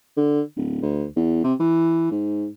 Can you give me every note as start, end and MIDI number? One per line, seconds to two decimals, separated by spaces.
0.17 0.41 50
0.56 0.78 26
0.82 1.06 38
1.16 1.40 40
1.44 1.53 48
1.60 2.07 52
2.11 2.47 44